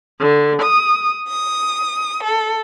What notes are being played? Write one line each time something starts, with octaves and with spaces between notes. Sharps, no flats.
D3
D#6
D#6
A4